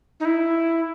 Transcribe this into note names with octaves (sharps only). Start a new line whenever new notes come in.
D#4
E4